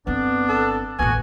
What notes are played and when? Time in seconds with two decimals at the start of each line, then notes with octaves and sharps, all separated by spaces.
0.07 G1 B3 C4 D4
0.49 A4
0.99 A1 D#2 B3 F#4 G#5